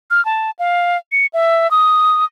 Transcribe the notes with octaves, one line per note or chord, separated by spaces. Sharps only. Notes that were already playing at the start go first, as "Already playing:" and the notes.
F6
A5
F5
C#7
E5
D#6